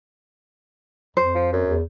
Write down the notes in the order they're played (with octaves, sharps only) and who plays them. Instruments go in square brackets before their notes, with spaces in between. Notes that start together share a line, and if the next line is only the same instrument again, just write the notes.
[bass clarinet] F2 [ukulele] C5
[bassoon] F3
F#2
[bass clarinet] E2